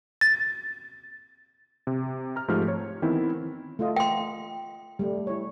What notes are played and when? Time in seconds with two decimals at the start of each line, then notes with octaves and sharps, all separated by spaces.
0.21 A6
1.87 C3
2.36 A#5 F6
2.48 G#2 F3 A3 G4 F6
2.68 C#5
3.02 D#3 E3 B3 C4 E4
3.79 A3 F4 D#5
3.96 G5 C6
4.99 G3 A3
5.27 E4 C#5